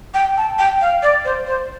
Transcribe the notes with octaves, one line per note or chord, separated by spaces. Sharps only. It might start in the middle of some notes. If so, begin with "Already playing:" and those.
G5
A5
G5
F5
D5
C5
C5